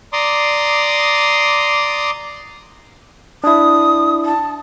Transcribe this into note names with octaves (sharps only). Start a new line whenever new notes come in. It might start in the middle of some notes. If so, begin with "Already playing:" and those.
D5 A#5 C6 D6 D#6
D4 E4 D#6
A5